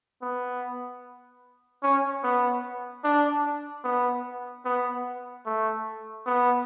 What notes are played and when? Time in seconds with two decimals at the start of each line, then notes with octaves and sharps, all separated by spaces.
0.22 B3
1.83 C#4
2.23 B3
3.04 D4
3.84 B3
4.65 B3
5.45 A3
6.26 B3